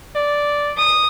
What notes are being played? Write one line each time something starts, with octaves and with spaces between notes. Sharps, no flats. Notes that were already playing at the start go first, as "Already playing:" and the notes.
D5
D#6